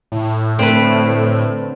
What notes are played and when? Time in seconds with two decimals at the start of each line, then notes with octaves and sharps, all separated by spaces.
0.12 A2
0.59 D3 A3 C4 B4